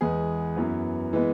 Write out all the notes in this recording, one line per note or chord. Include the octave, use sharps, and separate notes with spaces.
E2 E3 G#3 B3 G#4
F#2 E3 B3
E3 G#3 B3